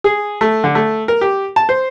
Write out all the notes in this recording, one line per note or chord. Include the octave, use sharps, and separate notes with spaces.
G#4
A3
D3
A3
A#4
G4
A5
C5